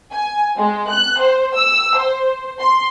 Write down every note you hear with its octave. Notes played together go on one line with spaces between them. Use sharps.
G#5
G#3
F#6
C5
E6
C5
C6